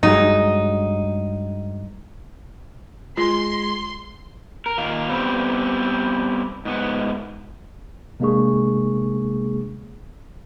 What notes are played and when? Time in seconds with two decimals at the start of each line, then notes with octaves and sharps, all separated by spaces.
0.03 G2 F#3 G#3 D#4
3.17 G#3 F4 C6
4.66 A#4
4.78 A#2 D#3 F5
5.08 G3 B3 C4
6.65 G#2 B3
8.20 C3 G#3 A#3 D4 G#4 C#6